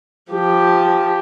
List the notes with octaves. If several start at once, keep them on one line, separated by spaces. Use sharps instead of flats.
F3 G4